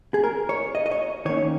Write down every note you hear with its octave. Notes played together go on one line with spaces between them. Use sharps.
G#4
A#4
C#5
D#5
D#5
C#5
D#3 A#3 C#4 C#5